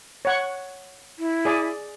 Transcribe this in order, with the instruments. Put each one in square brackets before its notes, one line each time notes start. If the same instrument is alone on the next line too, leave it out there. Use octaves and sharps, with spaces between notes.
[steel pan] C#5 F#5 C#6
[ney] E4
[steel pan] G#4 D5